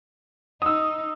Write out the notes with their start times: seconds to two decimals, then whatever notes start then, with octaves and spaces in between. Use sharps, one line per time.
0.62 D#4 D#6 E6